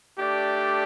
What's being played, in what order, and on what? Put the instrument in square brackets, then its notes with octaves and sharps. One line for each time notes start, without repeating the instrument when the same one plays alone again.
[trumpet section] A3 D4 G4 D5